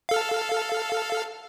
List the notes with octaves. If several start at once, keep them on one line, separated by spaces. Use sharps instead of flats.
A4 F5